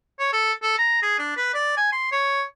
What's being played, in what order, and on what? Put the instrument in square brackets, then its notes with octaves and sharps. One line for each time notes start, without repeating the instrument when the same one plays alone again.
[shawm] C#5
A4
A4
A#5
G#4
D4
B4
D5
G#5
C6
C#5